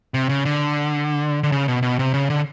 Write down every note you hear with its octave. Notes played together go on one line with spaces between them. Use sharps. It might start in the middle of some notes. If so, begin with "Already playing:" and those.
C3
C#3
D3
D3
C#3
B2
B2
C3
C#3
D3